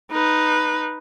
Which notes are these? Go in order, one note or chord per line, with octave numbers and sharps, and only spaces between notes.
D#4 B4